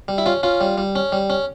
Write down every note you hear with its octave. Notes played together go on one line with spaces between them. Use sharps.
G3
E4
C#4 F4
C#4 F4
G3
G3
C#4
G3
C#4